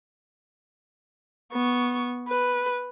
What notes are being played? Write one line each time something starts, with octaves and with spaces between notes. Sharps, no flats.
B3 C#6
B4